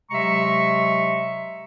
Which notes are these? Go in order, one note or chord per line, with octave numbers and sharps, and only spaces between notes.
C3 F#3 G#3 E5 A#5 C#6